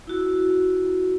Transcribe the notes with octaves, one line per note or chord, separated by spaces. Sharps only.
E4 F#4